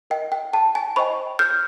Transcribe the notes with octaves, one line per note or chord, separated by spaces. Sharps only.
A#4 D#5 G5
G5
G5 A5
G#5
C5 D#5 G5 B5 C#6
F6 G6